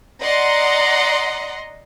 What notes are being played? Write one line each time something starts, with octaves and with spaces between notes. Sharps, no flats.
D5 D#5 F#5 A#5 C6